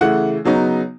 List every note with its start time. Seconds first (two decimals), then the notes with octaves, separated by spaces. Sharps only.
0.01 C#3 E3 A3 F#5
0.45 C#3 F#3 B3 D#4